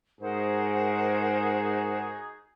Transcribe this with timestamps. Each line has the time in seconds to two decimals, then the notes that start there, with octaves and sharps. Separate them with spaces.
0.21 G#2 D#4 F#4 G#4 A#4 C5 F#5